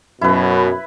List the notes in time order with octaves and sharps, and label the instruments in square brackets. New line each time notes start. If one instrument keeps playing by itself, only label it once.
[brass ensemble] F#2 B2 [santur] E4 B4